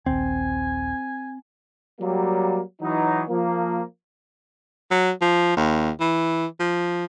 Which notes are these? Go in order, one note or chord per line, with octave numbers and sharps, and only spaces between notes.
D#1 A#1 D#2 C4 G#5
F#3 G3 A#3
E3 F#3 D#4
F3 A#3
F#3
F3
D#2
E3
F3